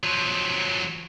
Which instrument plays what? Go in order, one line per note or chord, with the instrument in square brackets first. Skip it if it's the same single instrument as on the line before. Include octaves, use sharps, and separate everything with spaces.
[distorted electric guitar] F3 F#3